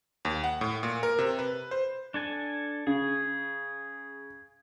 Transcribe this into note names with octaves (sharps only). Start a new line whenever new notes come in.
D#2
F#5
A2
A#2
A#4
C3
B4
C5
D4 A4 G#5
C#3 G#4